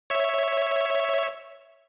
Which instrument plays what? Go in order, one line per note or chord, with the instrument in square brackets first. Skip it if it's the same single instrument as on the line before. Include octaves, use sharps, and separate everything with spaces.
[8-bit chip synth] C#5 E5